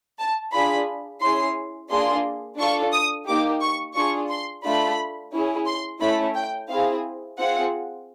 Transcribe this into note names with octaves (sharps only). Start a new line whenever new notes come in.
A5
D4 F4 G#4 B5
C#4 E4 G#4 C6
A#3 D4 F4 G#4 C6
D4 F4 A4 C#6
D#6
A#3 D#4 G4 D6
C#6
D4 F4 G#4 C#6
C6
A3 D4 F4 B5
C#4 E4 G#4
C6
A3 C#4 E4 B5
G5
C4 E4 G#4 F5
C4 F4 G#4 F#5